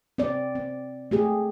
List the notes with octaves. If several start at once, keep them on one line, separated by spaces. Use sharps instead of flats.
C4 D5
C4
A3 G4 G#4